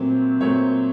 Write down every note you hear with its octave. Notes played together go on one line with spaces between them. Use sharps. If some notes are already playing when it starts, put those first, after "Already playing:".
Already playing: A#2 F#3 A3 C4
A#2 F#3 A3 C4 C#5